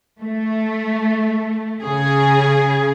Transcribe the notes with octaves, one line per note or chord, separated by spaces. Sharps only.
A3
C#3 G#4